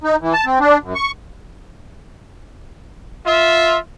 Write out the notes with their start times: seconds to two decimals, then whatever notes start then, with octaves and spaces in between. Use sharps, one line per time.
0.04 D#4
0.21 E3
0.33 A5
0.46 C4
0.60 D4
0.82 F#2
0.95 C#6
3.26 F4 E5